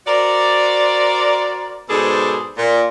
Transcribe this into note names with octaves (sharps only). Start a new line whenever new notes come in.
F#4 A#4 C5 D5
G#2 B2 G#4 A4 C5 D5
A#2